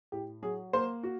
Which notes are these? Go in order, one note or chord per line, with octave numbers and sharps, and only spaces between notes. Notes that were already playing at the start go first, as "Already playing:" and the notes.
A2 G4
F#3 G#4
A#3 C5
F#4